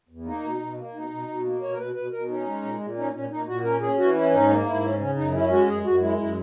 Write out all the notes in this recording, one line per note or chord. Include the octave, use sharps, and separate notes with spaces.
E2
A#3 D#4
B2
B2
A#3
B2 D#4
B2
B2
A#3
B2 C#5
A#4
B2 B4
B2 B4
B2 A#4
C#4 D#4
G#3
A#2
A#2
C#4 D#4
A#2 C#4
A#2 D#4
A#2 F#4
C#4 A#4
C#4 G#4
E3 F#4
C#4 E4
G#2 D#4
A#3
G#2 E4
C#4
C#3 C#4
F#2 D#4
C#4 E4
G#3 F#4
F#2 G#4
F#2 F#4
G#3 E4
F#2 E4